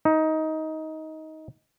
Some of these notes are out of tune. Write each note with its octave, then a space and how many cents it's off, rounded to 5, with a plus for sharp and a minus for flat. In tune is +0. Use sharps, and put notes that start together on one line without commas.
D#4 +15